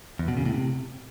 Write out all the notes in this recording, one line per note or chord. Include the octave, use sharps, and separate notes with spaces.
E2
B2
C#3
A2
C3